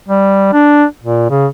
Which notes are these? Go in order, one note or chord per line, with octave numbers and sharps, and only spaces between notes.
G3
D4
A#2
C#3